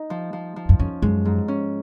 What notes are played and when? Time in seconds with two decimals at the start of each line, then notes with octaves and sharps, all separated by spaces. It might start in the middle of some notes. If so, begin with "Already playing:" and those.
Already playing: D#4
0.10 F3
0.33 F3
0.56 F3
0.69 F#2
0.79 F2 C#4
1.02 F#2 G#3
1.25 G#2
1.48 C#4